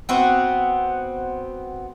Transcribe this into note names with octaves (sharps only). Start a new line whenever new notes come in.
B3 C4 F#4